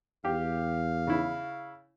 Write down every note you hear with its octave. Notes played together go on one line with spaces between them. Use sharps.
E2 G4 F5
C#3 E4